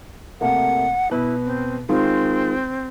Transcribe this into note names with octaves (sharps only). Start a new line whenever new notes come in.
C3 A3 A#3 F#5
B2 E4 B4
C4
D#3 G#3 C4 F4